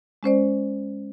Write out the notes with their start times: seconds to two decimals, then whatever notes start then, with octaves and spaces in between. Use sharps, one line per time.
0.23 G#3 C#4 C5 D5